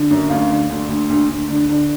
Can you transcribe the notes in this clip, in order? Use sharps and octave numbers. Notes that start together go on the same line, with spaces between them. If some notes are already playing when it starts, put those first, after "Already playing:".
Already playing: D3
F#2
D2 F5
D3
D2
D2
D2
D2
D3
D3